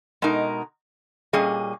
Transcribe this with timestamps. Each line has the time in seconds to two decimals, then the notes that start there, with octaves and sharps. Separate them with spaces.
0.22 B2 G#3 D#4 A#4
1.33 A#2 G3 C#4 G#4 D#5